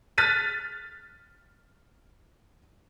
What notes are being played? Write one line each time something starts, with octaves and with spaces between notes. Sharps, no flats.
F6 F#6 A6 B6 D#7